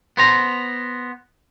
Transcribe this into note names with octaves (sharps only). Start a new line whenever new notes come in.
B3 C5 A#5